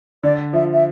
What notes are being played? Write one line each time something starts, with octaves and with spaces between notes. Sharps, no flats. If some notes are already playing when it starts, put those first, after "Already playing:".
D3 D5
F3 E5
E5